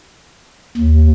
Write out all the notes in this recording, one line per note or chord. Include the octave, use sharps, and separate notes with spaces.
D#2